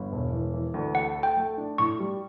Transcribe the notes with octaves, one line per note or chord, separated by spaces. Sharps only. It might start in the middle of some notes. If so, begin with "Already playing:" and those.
Already playing: G1
E1
E3
E3
D2
A4 F#5
A4
G5
A3
D4
A2 C#6
G3